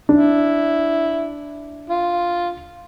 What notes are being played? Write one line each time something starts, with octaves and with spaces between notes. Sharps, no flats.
D4 E4
F4